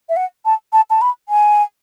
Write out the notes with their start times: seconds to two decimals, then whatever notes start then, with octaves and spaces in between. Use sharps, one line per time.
0.09 E5
0.16 F#5
0.45 A5
0.73 A5
0.90 A5
1.02 B5
1.29 G#5